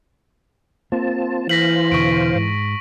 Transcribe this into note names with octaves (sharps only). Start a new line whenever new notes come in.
A#3 C4 F4 A5
E3 C5 F5 A#6 B6 F#7
E1 B2 D3 C#6 D7
G#2